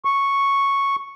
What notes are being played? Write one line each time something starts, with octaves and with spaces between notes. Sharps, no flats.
C#6